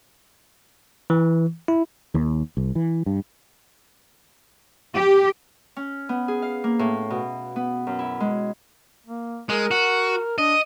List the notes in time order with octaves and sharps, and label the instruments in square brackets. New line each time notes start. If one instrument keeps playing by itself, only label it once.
[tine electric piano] E3
E4
[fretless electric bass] D#2
C2
E3
G2
[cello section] G4
[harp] C#4
B3
G#4
F5
A#3
A2
B2
B3
F#2
E4
G#3
[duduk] A#3
[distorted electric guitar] G#3 [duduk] A#4
[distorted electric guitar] F#4
[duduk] D4 [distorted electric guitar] D#5